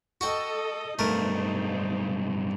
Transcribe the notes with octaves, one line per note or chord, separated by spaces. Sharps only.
F#4 A4 D#5 F#5 G5
B1 G2 A3 D#4 A#4 C5